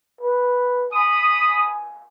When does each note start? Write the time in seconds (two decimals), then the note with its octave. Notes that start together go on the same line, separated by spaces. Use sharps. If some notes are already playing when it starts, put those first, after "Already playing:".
0.21 B4
0.93 G#5 B5 D#6